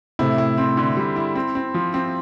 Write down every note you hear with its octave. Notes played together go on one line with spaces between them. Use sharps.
A2 C3 E4
E4
C4
D3
G3
E4
C4
C4
F3
C4